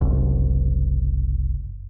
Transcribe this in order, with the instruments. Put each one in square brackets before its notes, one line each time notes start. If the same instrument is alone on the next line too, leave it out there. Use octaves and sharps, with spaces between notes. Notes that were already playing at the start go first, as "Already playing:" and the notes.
[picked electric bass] F#1 C2